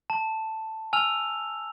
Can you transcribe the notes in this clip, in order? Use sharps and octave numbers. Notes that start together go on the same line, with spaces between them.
A5
G#5 E6 F6 F7